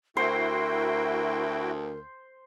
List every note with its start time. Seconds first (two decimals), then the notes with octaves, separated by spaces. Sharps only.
0.17 D2 E4 F#4 A#4 C5 G5